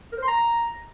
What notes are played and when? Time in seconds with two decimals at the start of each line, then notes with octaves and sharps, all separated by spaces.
0.12 A#4
0.17 C5
0.23 C6
0.28 A#5